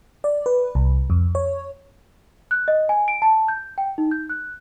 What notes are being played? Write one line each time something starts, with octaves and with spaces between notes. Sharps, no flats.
D5
B4
C2
F2
C#5
F#6
D#5
G#5
D7
A5
G6
G5
D#4
G6
F#6